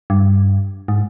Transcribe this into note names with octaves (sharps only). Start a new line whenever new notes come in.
G2
G#2